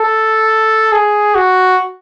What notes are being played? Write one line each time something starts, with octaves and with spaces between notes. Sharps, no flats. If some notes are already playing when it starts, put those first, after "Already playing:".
Already playing: A4
G#4
F#4